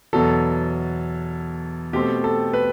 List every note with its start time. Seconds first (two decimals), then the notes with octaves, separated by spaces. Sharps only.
0.13 E2 B2 F#3 A4
1.93 B2 A3 C4 G4
2.24 A4
2.53 B4